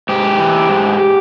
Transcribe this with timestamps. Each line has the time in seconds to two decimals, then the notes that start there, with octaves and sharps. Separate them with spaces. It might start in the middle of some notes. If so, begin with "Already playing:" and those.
0.09 G#2 G4
0.39 E3
0.69 G#2